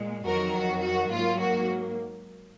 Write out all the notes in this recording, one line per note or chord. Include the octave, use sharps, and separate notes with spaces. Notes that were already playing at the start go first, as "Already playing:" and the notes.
Already playing: A#2 G#3
F2 D#3 F#3 F#4 A#4
F#4
F#4
G#2 F#3 A#3 F4
F#4